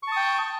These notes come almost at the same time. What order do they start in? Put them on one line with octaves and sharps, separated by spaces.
C#6 A5 D#6 G5